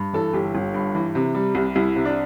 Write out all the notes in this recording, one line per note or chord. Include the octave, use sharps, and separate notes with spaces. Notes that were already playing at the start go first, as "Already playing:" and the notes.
Already playing: G2
E3 A4
G1 G4
G1
G2
E3
C3
G3
C2
C2 E4
C3
D4